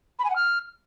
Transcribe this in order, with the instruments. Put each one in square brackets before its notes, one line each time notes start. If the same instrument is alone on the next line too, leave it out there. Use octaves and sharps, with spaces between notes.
[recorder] B5
G#5
F#5
F6